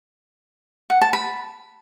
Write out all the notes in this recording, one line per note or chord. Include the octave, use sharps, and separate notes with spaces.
F#5
A5
B5